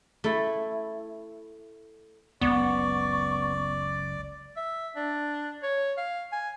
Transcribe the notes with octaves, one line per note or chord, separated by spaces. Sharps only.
A3 E4
F#1 C#2 B3 D5 C#6
E5
D4
C#5
F5
G#5